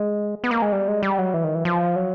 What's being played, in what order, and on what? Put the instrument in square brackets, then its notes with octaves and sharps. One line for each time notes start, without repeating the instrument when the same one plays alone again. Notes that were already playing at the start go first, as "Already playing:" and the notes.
Already playing: [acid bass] G#3
B3
A#3
G#3
G3
G#3
G3
F#3
E3
D#3
E3
F3
F#3